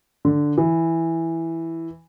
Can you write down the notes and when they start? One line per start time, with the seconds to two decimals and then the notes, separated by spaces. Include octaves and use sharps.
0.25 D3
0.58 E3